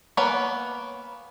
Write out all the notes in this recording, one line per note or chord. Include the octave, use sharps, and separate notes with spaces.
A#3 B3 C#5 G#5